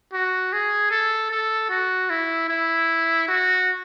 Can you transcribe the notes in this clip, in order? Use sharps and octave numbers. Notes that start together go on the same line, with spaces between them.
F#4
G#4
A4
A4
F#4
E4
E4
F#4